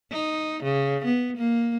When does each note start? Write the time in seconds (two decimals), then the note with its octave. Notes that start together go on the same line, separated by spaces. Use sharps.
0.12 D#4
0.63 C#3
1.05 B3
1.37 A#3